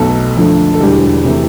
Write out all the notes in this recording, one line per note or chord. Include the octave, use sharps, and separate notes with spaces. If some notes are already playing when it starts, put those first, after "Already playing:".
Already playing: B1 B2 A3 A4
F2 D3 F3 A3
A4
E1 E2 D3 G3 G4
C3 E3 A3